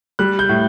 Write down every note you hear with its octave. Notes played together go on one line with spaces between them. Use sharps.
G3 F#6
G6
A2